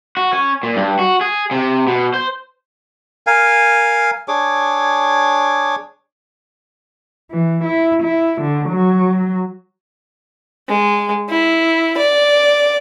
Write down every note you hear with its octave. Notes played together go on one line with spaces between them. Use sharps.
F#4
C#4
A#2
G2
F#4
G#4
C3
B2
C5
A#4 F5 G#5
D4 G#4 C#5 D6
E3
E4
E4
D3
F#3
G#3
E4
D5